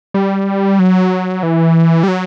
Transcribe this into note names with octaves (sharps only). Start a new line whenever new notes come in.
G3
F#3
E3
G3
F#3